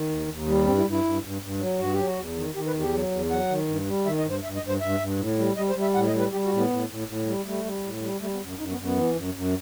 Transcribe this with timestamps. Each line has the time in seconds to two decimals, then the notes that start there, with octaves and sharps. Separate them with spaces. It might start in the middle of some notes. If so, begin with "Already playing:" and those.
Already playing: D#3
0.09 D#2
0.28 D#2
0.47 G3
0.65 G2 C4
0.78 E4
0.84 G2
0.91 E4
1.04 G2
1.22 G2
1.41 G2
1.60 F#3
1.79 G2 F#4
1.93 G4
1.98 F#3
2.07 F#4
2.17 E2
2.36 D#3
2.55 D#3 G4
2.67 B4
2.74 E2
2.80 G4
2.93 F#3
3.11 E2
3.30 F#3 F#5
3.49 D#3
3.68 G2
3.87 G3
4.05 D#3 E5
4.19 D#5
4.24 G2
4.31 C5
4.43 G2 E5
4.56 D#5
4.62 G2
4.68 C5
4.81 G2 E5
5.00 G2
5.19 A2
5.38 G3
5.56 G3 D#5
5.69 C5
5.75 G3
5.82 E5
5.95 A2 F#5
6.07 D#5
6.13 G3
6.19 B4
6.32 G3 G4
6.45 F#4
6.51 A2
6.57 B3
6.70 A2
6.89 A2
7.08 A2
7.26 G3
7.46 G3 A3
7.65 G3
7.83 A2
8.02 G3
8.21 G3 A3
8.33 B3
8.40 F#2
8.59 F#2 D#4
8.72 B3
8.78 F#2
8.84 B3
8.96 E3
9.15 F#2
9.34 F#2